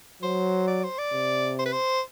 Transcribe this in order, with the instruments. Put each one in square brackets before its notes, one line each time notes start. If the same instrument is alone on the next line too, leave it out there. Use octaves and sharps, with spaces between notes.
[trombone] F#3 [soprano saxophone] C5
[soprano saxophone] D5
C5
D5
[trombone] C3
[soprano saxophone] C5
B4
C5